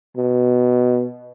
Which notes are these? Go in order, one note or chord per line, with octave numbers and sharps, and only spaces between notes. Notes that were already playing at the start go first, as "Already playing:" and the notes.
B2